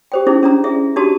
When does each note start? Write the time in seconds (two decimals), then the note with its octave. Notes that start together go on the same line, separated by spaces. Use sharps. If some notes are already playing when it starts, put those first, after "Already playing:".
0.12 G4 C5 G5
0.27 C#4 D#4 E4 G#4 C5
0.43 C#4 D4 A#5
0.64 G#4 E5
0.96 D4 D#4 F#4 G4 A5